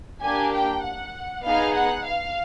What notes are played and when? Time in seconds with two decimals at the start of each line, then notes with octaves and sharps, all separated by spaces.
0.22 A#3 D4 G4 G#5
0.53 G5
0.84 F#5
1.44 B3 D#4 G#4 F5
1.75 F#5
2.06 F5